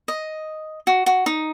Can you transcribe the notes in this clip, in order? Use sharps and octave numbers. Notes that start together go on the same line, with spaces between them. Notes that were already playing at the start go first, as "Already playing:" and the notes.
D#5
F#4
F#4
D#4